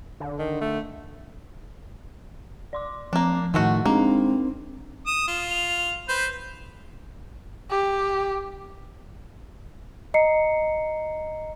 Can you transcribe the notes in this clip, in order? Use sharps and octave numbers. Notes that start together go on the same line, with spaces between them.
D3
D#3
A3
D5 C6 D6
F3 A#3 C4 D4
A2 D#3 G#3 A3 F#4 F#5
G#3 A#3 C4 D4 D#4
D#6 E7
F4
F7
B4 C5 G6
G4
D#5 A#5 C7 C#7